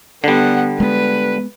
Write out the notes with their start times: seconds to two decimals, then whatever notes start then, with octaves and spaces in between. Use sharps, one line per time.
0.24 D3 G3 B3 F#5
0.80 G#3 B3 B4